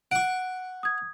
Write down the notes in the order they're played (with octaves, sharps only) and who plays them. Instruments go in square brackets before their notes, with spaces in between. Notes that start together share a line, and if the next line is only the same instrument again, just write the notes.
[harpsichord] F#5 C#6 [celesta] D7
[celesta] D#6 G#6